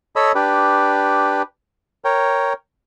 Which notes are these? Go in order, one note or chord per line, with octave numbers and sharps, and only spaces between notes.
A4 C#5 D#5 B5 E6
D4 G4 B4
A#4 C#5 G5